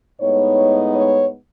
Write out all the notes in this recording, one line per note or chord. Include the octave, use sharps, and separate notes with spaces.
A2 G#3 B3 D#4 C#5
C#5